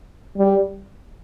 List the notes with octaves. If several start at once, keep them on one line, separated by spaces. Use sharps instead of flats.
G3